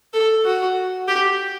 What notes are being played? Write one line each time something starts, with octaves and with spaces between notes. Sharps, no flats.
A4
F#4
G4